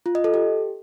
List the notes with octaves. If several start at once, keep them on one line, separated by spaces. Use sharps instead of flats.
F4
D#5
A4
G4